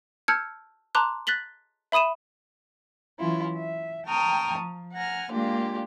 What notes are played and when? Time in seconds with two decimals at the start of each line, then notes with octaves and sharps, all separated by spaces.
0.28 A5 E6 F6 G6 G#6 C#7
0.95 A5 A#5 C6 D6 F#6
1.27 F#6 A6 B6 F#7 G7
1.92 E5 B5 D#6 D#7 E7
3.19 E3 F#3 C#4 E4 F4
3.55 E5
4.06 G5 A5 A#5 C#6 D#6 F6
4.58 F3
4.93 F#5 G#5 A#5 F6
5.31 G#3 A#3 D4 F4 G4